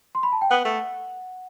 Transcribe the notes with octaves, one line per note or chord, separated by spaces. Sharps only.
C6
B5
A5
G5
B3 F#5
A3